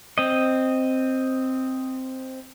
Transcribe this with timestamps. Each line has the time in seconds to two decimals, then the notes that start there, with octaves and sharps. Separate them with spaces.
0.18 C4 D#5